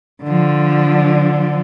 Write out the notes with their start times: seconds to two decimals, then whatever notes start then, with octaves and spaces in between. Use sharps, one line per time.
0.24 D3 F3